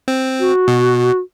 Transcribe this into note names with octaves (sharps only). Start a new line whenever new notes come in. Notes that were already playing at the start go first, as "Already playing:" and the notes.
C4
F#4
B2